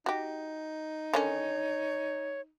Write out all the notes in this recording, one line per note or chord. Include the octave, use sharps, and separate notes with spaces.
D#4 F#4 G4
D3 D#3 C#4 C#5